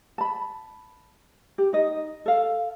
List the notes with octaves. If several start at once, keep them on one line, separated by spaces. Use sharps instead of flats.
A5 B5
G4
D#4 D#5
A4 F5